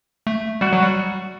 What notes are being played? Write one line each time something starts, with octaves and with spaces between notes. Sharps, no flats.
A3
G3 F#4
F#3
G3